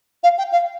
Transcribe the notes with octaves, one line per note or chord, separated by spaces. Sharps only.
F5
G5
F5